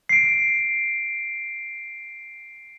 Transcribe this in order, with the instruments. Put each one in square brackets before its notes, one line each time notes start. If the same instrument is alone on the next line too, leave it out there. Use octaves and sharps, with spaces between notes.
[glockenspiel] C7 D7